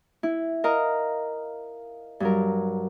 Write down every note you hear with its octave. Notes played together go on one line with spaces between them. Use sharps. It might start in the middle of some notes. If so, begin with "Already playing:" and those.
E4
A#4 D#5 F5 A#5
G2 F#3 A#4